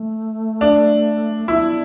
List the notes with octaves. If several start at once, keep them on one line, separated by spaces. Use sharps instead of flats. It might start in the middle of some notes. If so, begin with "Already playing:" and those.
Already playing: A3
D4
B3 E4